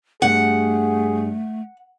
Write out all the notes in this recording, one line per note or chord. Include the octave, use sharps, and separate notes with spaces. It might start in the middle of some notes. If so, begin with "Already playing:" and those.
G2 A3 G#4 F#5